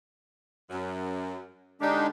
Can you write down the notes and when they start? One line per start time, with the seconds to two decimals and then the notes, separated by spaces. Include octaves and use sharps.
0.70 F#2
1.81 D3 G#3 D4 D#4 G4